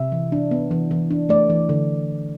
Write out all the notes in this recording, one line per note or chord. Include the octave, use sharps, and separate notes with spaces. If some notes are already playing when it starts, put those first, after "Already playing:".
Already playing: C3 E5
E3
D4
B3
E3
E3
D4
A3 D5
E3
D3